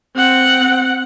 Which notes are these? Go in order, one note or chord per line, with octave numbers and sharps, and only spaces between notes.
C4 F#5